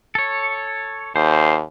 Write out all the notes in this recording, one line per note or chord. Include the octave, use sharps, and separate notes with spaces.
A4 C#5
D#2 C5